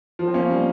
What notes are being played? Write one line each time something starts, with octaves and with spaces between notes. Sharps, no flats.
F3
C4
A#3 C#4
G3 A#3